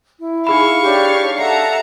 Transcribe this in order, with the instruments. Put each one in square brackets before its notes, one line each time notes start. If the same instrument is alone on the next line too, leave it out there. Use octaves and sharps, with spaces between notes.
[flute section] E4
[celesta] D#4 G#4 B5 [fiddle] F5 C#6
[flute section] D4 G4 C#5
[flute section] A4 E5 F#5 [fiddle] A5 A#5 [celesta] C7